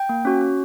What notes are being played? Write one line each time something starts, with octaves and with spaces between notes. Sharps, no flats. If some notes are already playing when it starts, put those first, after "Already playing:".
Already playing: G5
A#3
C#4 F#4
C#4